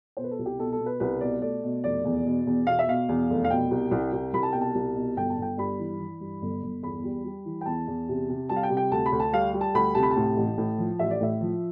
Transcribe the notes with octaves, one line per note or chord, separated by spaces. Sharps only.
B2 C5
B4
A4
C2
G4
B2 A4
A4
B2
B4
C2 B4
B2 D5
A3 D5
B2
F1 D5
E2
B2
E2
B2 F5
E5
B2 F5
E2
F1
F5
B2 G5
C2
C2
C2
C2 B5
A5
B2 G5
A5
C2
B2
G1 G5
A5
G1
G5
G2 B5
E3
E3
G2
G1
G1
E2 B5
G3
G3
E3
G5
E2 A5
E2
C3
C3
G3 A5
F5
G5
C3
G5
D2 A5
B5
D2
A5
G3 F5
G3
A5
D2 B5
C3 A5
B5
A5
A2
A1
A2
F3
A1 E5
D5
A2 E5
F3